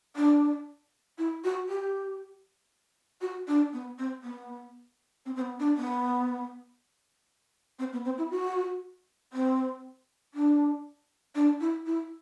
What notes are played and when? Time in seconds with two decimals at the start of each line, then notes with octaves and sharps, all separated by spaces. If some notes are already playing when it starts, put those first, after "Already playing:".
0.16 D4
1.18 E4
1.44 F#4
1.69 G4
3.21 F#4
3.48 D4
3.73 B3
3.99 C4
4.23 B3
5.26 C4
5.36 C4
5.41 B3
5.60 D4
5.77 B3
7.79 C4
7.93 B3
8.05 C4
8.18 E4
8.31 F#4
9.33 C4
10.34 D4
11.35 D4
11.61 E4
11.86 E4